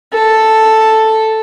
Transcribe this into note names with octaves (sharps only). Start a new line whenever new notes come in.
A4